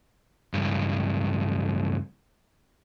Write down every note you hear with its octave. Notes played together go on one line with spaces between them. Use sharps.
C#2 G2